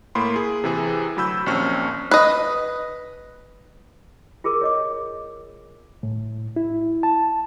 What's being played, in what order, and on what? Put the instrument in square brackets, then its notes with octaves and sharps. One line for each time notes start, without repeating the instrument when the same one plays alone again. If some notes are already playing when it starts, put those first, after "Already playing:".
[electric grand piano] A2 A#3 B5 C6
G#4
C3 E3 G#4
D2 F#3 B5 E6 G6
A#1 D#2 C4 C#4 C#6 F6
[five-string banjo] B4 D#5
[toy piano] F4 G#4 A#4 D6
C#5 D#5 D6
[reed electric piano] A2
E4
A5